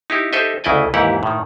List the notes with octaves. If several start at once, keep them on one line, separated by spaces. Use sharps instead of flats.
D#4 E4 G4
D#4 G4 A4 C5 D#5 E5
D2 C#3 E4 D5 D#5 G#5
D#2 G#2 E3 E4 G4 F#5
A2 D#3